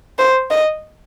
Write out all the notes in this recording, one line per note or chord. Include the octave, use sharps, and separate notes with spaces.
C5
D#5